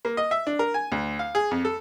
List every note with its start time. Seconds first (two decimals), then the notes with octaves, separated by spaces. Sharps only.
0.05 A#3
0.17 D#5
0.31 E5
0.47 D4
0.59 A#4
0.74 G#5
0.92 D2
1.19 F5
1.35 G#4
1.51 F2
1.65 A4